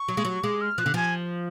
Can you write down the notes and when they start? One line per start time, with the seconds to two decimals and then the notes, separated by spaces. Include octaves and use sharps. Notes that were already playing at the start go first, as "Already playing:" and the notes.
Already playing: C#6
0.08 F#3
0.17 G#3
0.25 F#3
0.43 G#3 D6
0.61 F6
0.78 F3 F#6
0.86 D3
0.94 F3 G#5